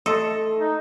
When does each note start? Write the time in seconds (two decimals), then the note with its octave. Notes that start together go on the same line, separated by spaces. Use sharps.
0.06 A3 A4 D#5 C6
0.59 D#4